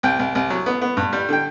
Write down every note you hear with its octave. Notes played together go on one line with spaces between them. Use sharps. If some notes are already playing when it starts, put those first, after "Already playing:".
C2 G5
C2
C2
F#3
B3
B3
G2
G3
D3 G5